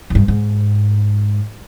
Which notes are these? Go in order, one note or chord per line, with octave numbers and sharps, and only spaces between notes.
G#2
G2
G#2